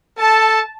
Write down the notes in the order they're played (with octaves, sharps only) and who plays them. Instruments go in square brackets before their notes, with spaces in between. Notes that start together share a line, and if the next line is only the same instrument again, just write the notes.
[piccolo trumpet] A4 [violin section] A5